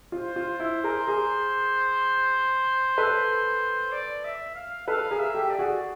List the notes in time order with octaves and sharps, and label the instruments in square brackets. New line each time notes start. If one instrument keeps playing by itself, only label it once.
[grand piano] F4 [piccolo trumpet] C5
[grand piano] F4
E4
G#4 A#4
G#4 A#4
A4 B4
[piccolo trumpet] D5
E5
F5
[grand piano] A4 B4 [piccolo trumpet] F5
[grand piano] G#4 A#4
[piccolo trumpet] E5
[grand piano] G4 A4
[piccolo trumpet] D5
[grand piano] F#4 G#4